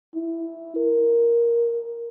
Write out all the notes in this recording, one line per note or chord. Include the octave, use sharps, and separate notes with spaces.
E4
A#4